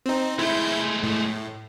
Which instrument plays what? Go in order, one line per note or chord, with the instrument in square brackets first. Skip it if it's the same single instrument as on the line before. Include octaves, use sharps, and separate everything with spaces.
[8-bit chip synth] C4 D#4
[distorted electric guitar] G#3 A3 [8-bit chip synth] E4 G6
[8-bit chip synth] A2